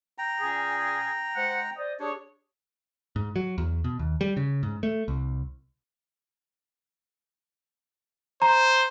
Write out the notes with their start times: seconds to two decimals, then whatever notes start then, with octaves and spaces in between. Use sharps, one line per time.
0.18 G5 A#5
0.39 A#2 C#4 G#4
1.35 G#3 C5 F#5
1.77 C5 D5 D#5
2.00 D4 G4 G#4 C#5
3.16 G#2
3.36 F#3
3.58 E2
3.84 B2
3.99 D#2
4.21 G3
4.37 C#3
4.63 G#2
4.83 A3
5.08 C2
8.42 C5 A#5